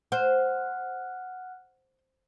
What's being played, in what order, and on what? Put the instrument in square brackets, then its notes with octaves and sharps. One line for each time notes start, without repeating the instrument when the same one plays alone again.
[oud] C5 [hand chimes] F#5 F6 F#6